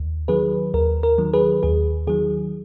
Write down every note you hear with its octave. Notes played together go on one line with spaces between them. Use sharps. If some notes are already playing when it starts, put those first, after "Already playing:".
Already playing: D#2
D#3 F#3 G#4 B4
D#2 A#4
A#4
D#3 F#3
G#4 B4
D#2 G#4
D#3 F#3 G#4